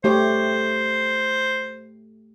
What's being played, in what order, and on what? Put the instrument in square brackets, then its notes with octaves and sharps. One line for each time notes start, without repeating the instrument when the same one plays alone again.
[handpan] A3 G4 C#5 [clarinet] C5